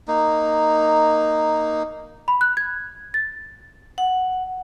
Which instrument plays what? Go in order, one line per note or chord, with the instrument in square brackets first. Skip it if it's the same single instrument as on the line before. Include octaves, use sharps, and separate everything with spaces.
[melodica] A#3 D#4
[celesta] B5
F#6
G#6
A6
[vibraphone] F#5